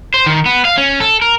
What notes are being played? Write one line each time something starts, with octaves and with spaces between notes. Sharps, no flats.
C5
D#3
B3
F5
C#4
A4
A#4